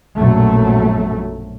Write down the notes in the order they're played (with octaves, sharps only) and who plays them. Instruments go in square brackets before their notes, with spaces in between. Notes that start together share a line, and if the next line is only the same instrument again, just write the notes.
[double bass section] A#1 F#2 B2 F#3 A3